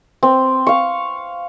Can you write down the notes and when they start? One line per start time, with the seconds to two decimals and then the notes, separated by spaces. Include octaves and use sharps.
0.23 C4
0.67 F5 C#6